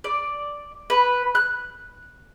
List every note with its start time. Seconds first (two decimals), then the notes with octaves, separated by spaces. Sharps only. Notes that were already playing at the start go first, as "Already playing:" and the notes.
0.04 D5
0.90 B4
1.35 F#6